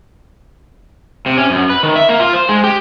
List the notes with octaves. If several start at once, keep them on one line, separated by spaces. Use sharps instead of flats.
C3
C#4
F#2
B4
D#3
E5
A#3
F4
C5
G#3
G4